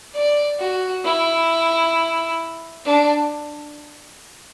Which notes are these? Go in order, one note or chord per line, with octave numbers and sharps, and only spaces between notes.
D5
F#4
E4
D4